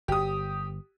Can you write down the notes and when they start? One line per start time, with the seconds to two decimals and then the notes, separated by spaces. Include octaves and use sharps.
0.08 G1 G4 D#6